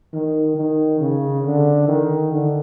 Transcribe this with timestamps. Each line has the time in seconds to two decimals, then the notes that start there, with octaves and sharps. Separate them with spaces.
0.13 D#3
0.56 D#3
1.00 C#3
1.45 D3
1.88 D#3
2.32 D3